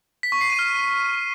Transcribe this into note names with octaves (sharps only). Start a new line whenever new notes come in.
B6
C#6
C7
D#7
F6